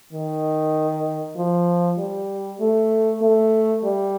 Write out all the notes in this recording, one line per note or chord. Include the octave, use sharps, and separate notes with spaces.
D#3
F3
G3
A3
A3
G3